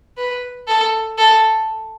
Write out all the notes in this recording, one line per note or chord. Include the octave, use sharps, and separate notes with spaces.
B4
A4
A4